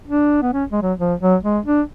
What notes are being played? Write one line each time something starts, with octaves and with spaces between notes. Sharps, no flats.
D4
B3
C#4
G#3
F#3
F3
F#3
G#3
D4